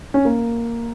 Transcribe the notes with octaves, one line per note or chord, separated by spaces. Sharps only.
C#4
A#3